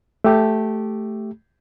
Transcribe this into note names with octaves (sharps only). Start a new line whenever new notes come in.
A3 G4